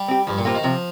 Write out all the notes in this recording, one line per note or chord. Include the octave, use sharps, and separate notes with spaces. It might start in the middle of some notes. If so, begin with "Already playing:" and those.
Already playing: G3
C4 G4
G2 F3
A#2
C3 A#3 F4
D#3
C3 F3